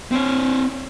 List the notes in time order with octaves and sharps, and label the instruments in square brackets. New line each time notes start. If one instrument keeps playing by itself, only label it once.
[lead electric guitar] C4 C#5